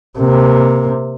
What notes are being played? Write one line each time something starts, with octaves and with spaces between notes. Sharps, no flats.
C3 A#3